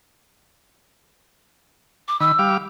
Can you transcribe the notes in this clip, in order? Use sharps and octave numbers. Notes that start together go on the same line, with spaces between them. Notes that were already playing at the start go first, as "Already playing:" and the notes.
D6
D#3 B5 E6
G3 F5 D6